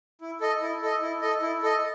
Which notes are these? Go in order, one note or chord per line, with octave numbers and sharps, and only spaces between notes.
E4
A4 D#5
E4
A4 D#5
E4
A4 D#5
E4
A4 D#5